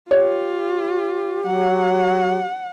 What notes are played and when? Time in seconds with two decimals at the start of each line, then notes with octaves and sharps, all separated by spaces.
0.11 F4 G4 C#5
1.47 F#3 F#5